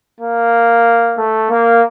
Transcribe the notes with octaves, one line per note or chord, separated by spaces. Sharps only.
A#3
A3
A#3